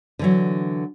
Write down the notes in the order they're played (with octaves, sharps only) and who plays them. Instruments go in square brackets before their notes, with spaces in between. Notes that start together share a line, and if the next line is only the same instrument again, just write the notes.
[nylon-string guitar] D3 E3 F#3